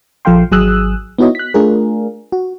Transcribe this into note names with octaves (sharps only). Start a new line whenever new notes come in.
A#1 F3 A4 F5 G5 C6
G#1 F#3 G#4 D#6 E6 F#6
B3 D#4 E4 F#4 C#5 D#5
F#6 B6
A3 D4 F4 G#4 A#4
F#4